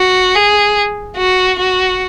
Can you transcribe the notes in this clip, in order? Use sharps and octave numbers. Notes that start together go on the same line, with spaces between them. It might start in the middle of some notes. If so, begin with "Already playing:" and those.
Already playing: F#4
G#4
F#4
F#4